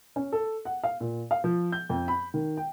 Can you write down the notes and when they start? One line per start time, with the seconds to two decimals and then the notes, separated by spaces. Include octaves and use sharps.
0.16 C#4
0.32 A4
0.65 F#5
0.84 F5
1.00 A#2
1.31 F5
1.44 F3
1.72 G6
1.90 F2
2.08 B5
2.34 D#3
2.57 G5